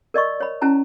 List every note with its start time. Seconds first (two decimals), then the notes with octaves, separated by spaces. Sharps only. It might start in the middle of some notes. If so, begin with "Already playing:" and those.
0.14 A#4 D5 D#5 C#6
0.40 C#5 B5
0.61 C#4 E4 A5 A#5